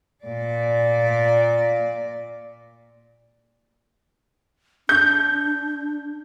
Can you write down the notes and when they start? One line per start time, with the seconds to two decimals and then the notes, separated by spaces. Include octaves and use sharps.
0.24 A#2 D5
4.89 D4 G6